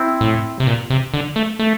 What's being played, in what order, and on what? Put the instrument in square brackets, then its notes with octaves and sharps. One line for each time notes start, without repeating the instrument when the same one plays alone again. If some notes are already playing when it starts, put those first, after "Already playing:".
Already playing: [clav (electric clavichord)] C4 E4
[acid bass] A2
C3
A#2
C3
D3
A3
A3